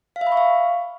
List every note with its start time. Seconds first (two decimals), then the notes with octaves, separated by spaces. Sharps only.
0.16 F5
0.21 E5
0.27 B5
0.32 C#6
0.37 F5